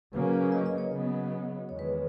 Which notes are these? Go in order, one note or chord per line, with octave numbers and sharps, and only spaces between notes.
C#3 F#3 A#3 C#4 B4
C#5
D#5
D#5
C#5
C#3 F#3 B3 D#5
E2 D#3 G#3 C#5
B4